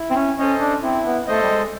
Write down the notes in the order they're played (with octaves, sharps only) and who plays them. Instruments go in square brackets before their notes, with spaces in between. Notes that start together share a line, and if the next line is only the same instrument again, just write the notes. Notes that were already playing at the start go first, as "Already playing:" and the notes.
Already playing: [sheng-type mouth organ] E4
[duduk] C4
C#4
[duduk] C#4 [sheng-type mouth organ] A4 C5 D#5
[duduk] D4
[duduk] C4 [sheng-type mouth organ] E4
[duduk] B3
[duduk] A3 [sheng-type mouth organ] A4 C5 D#5
[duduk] G3
G#3